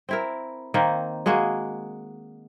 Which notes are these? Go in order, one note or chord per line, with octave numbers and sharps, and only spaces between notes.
C4 E4 A#4
D#3 A#3 C4
G#3 A#3 F#4 G#4